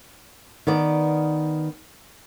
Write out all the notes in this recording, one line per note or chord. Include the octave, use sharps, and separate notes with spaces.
D#3 B3 D5